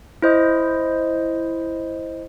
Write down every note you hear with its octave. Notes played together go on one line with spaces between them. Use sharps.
E4 C5 D#5